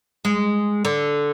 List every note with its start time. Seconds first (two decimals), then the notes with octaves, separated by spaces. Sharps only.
0.25 G#3
0.85 D3